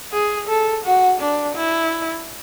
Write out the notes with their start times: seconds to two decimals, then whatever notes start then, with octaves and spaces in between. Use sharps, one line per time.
0.13 G#4
0.48 A4
0.85 F#4
1.21 D4
1.56 E4